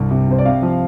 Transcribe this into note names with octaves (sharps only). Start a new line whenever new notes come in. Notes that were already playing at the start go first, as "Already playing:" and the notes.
Already playing: C2 G2
C3
C3 C5
D5
C3 F5
F3